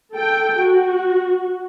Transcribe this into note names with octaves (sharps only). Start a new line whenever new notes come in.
A4 G5
F#4